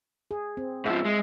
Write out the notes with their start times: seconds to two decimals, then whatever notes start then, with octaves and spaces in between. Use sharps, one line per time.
0.31 G#4
0.57 C4
0.86 G#2 F3 E5
1.06 G#3